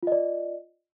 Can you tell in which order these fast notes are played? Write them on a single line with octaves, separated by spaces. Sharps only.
F4 D#5 D5